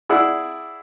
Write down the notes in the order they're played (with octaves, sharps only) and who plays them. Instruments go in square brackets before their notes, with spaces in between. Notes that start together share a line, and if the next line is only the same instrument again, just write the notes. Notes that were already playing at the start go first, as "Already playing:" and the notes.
[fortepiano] E4 G#4 D5 F#5 E6